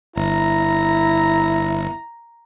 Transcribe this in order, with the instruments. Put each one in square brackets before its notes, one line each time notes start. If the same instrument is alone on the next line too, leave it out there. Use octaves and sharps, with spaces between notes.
[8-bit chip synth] G1 [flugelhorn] E4 [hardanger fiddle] A#5